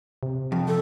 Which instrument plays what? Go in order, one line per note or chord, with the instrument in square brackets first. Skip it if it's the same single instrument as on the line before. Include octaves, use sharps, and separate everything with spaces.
[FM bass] C3
[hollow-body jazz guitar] F2
[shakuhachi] A4